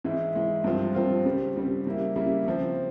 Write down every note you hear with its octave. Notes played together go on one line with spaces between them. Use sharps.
G#2 E3 G#3 E4
G#2 E3 G#3 E4
G2 F3 C4 F4
G2 F3 C4 F4
C#3 G3 C4
C#3 G3 C4
C#3 G3 A#3 E4
C#3 G3 A#3 E4
C#3 F3 C4